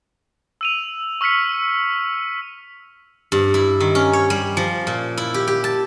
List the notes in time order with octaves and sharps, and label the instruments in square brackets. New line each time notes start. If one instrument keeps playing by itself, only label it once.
[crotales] E6 D#7 F7
C#6 E6 F6 B6 C#7
[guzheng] G2
E4
D#3
C#4
C#5
G3
F3
A#2
E4
G4
G4
A5